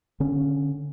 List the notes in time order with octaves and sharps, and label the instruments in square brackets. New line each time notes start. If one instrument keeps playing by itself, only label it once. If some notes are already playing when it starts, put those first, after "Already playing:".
[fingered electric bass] D3 C#4